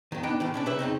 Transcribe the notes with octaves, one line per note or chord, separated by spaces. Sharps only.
F2 D#3
D#3 B3 D4 D#5 G5
A2 D#3 E3
B2 C#4 D4
C2 C#3 B4 C#5 E5
F2 C#3 C4 D#4